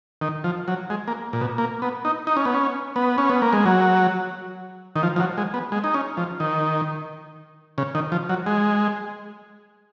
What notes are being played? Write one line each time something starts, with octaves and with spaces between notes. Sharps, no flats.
D#3
F3
F#3
G#3
A#3
A#2
B2
A#3
B3
D#4
D#4
C#4
B3
C#4
B3
C#4
B3
A#3
G#3
F#3
D#3
F3
F3
F#3
G#3
B3
G#3
D#4
C#4
F3
D#3
C#3
D#3
F3
F#3
G#3